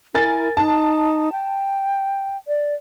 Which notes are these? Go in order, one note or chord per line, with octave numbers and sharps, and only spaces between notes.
E4 A#4 G#5 A6
D#4 A5
G5
D5